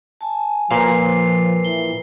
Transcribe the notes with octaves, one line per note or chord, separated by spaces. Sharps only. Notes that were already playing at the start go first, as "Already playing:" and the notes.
G#5 A5
A#2 F3 A#4 B4 F5 C7
E3 G7